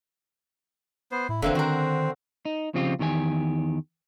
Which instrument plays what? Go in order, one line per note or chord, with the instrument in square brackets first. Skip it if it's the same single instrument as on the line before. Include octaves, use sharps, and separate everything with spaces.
[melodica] B3 C5
[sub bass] A2 [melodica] E4
[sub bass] F1 [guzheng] D3 E3 C4 [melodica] A#3 E5
[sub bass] D#3 [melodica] C4 [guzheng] F#4 A#4
[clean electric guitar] D#4
C#3 F3 C4 F4 G4
E2 D#3 G4 C5 G#5